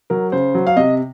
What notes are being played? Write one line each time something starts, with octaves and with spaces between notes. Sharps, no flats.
F#3 A#4
C#3 C5
F#3
F5
C3 D#5